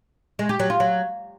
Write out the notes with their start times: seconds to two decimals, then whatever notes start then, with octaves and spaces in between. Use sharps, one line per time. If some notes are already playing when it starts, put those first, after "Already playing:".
0.39 G#3
0.49 G4
0.60 F#3
0.70 F4
0.80 F#3